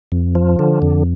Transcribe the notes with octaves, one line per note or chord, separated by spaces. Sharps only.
F2
F3
D3
F2